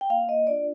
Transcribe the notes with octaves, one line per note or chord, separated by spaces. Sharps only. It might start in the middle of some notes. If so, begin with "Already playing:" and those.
G5
A#3 F5
D#5
D4 F4 D5